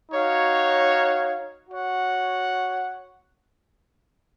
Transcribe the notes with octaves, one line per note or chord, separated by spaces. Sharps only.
D#4 F#4 C#5 F5
F#4 C#5 F#5